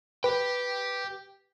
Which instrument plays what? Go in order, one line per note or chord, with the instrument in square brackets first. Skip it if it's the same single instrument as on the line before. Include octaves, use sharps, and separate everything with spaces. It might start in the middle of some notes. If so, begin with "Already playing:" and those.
[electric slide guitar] G4 G5 [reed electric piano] B4